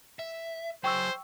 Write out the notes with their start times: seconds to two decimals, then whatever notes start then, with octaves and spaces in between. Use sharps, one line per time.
0.19 E5
0.84 F#3 G#4 C5 G5 C#6 E6